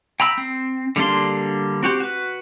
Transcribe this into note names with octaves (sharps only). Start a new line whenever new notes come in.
G5 A#5 B5 E6
C4
D3 G3 A#3 D4 C6
C4 F#4 G4 C5
F#4 B4